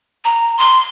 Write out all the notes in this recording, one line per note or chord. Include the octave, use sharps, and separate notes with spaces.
A#5
C6